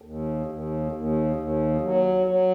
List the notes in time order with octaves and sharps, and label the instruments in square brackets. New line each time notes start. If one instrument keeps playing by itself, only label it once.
[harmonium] D#2
D#2
D#2
D#2
F#3
F#3